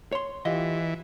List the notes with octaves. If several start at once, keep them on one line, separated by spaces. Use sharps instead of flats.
C#5 C6
E3 F4 G4 D#5